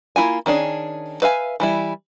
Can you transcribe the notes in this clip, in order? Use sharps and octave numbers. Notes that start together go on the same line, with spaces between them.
A#3 E4 F4 G#5
D#3 C#4 D4 G#4
B4 E5 F5 G#5
E3 G3 E4